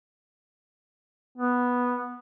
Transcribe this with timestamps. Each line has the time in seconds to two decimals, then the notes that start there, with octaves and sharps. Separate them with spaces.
1.38 B3